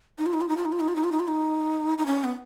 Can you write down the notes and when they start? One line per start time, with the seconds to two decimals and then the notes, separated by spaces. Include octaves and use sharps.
0.18 D#4
0.26 F4
0.33 D#4
0.41 F4
0.49 D#4
0.57 F4
0.65 D#4
0.72 F4
0.80 D#4
0.88 F4
0.96 D#4
1.04 F4
1.12 D#4
1.20 F4
1.28 D#4
1.98 D#4
2.06 C#4
2.24 B3